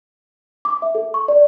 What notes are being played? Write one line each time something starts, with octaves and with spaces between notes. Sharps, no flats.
D6
E5
A4
C#6
D5